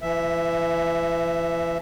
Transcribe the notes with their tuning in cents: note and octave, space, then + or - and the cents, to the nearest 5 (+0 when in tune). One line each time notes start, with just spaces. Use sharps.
E3 +35 E5 +0